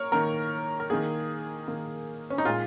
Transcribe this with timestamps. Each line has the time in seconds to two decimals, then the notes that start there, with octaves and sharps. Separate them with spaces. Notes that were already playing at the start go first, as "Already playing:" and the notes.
Already playing: A#3 A#4 C#5
0.12 D#3 A#3 A#4
0.80 A#4
0.90 D#3 A#3 G#4
1.68 D#3 A#3
2.30 C#4
2.38 D#4
2.45 A#2 G#3 F4